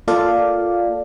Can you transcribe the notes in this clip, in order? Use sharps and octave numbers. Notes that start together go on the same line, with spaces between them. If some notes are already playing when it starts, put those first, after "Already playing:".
A#3 F4 A4 D5 F5